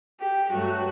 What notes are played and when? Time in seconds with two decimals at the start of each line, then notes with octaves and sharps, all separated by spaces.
0.20 G4
0.51 G2 F#3 A3 F#4